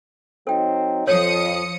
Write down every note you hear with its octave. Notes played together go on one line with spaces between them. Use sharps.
F#3 C4 D#4 A4 G5
F2 F3 C#5 D#6 C#7